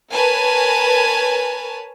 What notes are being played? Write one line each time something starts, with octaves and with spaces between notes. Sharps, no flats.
A#4 B4 C#5 G#5 A5